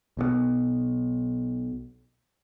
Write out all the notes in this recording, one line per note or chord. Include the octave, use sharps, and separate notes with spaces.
B1 B2 E3 B3